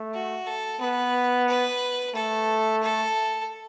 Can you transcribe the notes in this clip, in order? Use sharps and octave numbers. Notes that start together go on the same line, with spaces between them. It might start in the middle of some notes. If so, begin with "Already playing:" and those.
Already playing: A3
F#4
A4
B3 B4
B4
A3 A4
A4